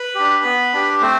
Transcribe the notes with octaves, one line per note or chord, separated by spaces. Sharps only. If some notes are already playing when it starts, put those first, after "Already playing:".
Already playing: B4 B5
D4 G4
B3
D4 G4
A3 C4 C5